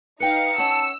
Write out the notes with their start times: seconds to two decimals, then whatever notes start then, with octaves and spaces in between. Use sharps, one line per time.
0.20 D#4 B4 F5 G5 C#7
0.58 C#4 F#5 A5 E6